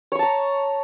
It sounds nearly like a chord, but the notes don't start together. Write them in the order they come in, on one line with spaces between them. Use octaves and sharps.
C#5 C#6 A5 A#5